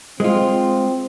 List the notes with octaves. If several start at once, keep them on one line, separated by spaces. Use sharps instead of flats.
G#3 C4 F4